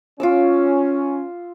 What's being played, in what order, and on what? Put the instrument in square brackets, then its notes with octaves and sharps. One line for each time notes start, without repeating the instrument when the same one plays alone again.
[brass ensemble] C#4 [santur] F4 D6 E6